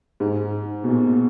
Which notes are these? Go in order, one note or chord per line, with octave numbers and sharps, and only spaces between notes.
G#2
B2
A#2